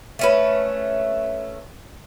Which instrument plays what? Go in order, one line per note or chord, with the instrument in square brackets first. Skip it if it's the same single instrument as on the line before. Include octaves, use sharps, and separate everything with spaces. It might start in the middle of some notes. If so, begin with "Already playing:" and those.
[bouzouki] A3 C#4 B4